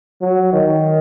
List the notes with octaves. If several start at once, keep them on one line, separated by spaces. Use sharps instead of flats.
F#3
D#3